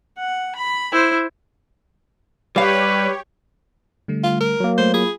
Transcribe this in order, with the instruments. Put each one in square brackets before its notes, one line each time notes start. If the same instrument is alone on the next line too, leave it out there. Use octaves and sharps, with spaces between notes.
[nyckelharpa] F#5
B5
E4 C5
[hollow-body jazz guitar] G3 F5 [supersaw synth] G4 C#5 [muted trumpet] B4
[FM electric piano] D3 G3 A3
[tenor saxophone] F4
A#4
[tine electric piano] F#3 A#3
[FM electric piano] A3 G6 [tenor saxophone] C5
[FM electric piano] F4 B5 [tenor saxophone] G#4